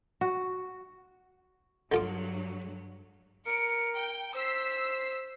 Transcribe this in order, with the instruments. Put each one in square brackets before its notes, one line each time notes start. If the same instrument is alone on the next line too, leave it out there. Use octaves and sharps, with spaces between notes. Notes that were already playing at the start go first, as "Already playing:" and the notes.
[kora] F#4
[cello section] G2 F#3 [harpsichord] D3 F4 D6
[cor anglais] A#4 [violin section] C#7 D7
[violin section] G5
[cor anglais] C5 [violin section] E6 B6 C7